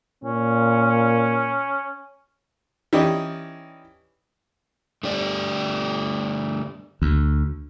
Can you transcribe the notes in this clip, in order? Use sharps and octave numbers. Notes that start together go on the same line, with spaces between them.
A#2 C#4
E3 C#4 D#4 G4 D5 D#5
D3 G3 A3 G4 D5
D2